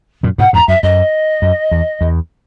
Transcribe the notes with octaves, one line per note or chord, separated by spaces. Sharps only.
F#2 A#2
G#2 B2 F#5
E2 G#2 A#5
F#2 E5
F#2 D#5
F#2
E2
E2